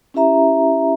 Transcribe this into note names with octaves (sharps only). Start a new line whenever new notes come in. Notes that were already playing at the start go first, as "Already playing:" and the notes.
C#4 E4 G4 E5 A#5